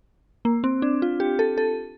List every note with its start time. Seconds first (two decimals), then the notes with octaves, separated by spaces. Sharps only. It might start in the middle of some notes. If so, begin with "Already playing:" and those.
0.45 A#3
0.64 C4
0.82 D4
1.02 F4
1.20 G4
1.39 A4
1.58 A4